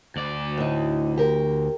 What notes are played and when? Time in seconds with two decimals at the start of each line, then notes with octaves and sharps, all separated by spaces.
0.16 D2 D5
0.58 A2 D#4
1.17 G4 A#4